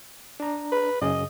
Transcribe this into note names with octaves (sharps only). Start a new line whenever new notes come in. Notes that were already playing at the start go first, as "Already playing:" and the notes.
D4 A#5
B4
F#2 C#3 G#4 D#5